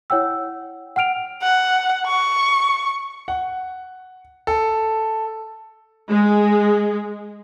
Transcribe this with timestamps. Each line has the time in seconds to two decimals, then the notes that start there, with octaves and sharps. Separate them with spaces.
0.10 E4 C#5 F#5 G5 E6
0.96 F#5 G5 F6 D7 F7
1.42 F#5
2.07 C#6
3.28 F#5
4.47 A4
6.09 G#3